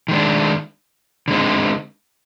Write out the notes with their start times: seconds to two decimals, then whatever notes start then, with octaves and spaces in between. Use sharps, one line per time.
0.08 D#3 G#3 D4
1.28 D3 G#3 C4 D#4